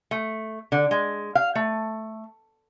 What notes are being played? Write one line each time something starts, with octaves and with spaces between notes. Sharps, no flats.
A3
D3
G#3
F5
A3